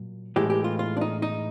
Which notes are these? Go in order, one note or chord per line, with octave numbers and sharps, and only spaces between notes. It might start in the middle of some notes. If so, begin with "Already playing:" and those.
Already playing: A#2 F#3
A2 E3 G#3 G4
G4
F4
F4
D4
D#4
D#4